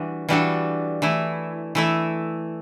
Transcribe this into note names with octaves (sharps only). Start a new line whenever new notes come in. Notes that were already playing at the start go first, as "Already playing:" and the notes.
Already playing: E3 G3 D4 F#4
E3 G3 D4 F#4 A4
E3 A3 E4
E3 A3 E4